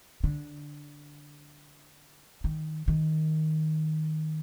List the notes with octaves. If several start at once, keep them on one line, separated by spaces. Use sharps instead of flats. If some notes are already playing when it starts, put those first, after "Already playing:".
D3
D#3
D#3